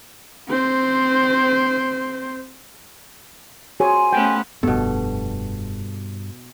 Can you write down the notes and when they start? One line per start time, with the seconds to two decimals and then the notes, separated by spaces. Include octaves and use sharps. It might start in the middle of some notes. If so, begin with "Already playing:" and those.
0.48 C4 C5
3.80 C4 F4 F#4 G#4 C#5 G#5 B5
4.13 A3 B3 C#4 G5
4.63 F1 G2 B2 B3 A4